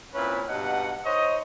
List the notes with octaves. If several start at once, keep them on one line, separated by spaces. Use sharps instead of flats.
A#2 C4 C#4 E4 B4
G2 B2 D#4 F#5
D#4 C5 C#5 D#5